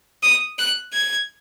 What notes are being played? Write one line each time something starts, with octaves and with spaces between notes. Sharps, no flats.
D#6
F#6
G#6